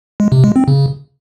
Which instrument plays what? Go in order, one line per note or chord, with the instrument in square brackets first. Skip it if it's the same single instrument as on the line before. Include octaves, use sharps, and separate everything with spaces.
[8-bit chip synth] G#3
C3
G#3
C4
C#3